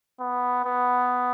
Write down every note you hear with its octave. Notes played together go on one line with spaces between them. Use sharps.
B3
B3